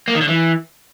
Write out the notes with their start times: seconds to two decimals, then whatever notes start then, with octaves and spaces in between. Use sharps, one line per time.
0.08 A#3
0.14 D#3
0.21 D3
0.28 E3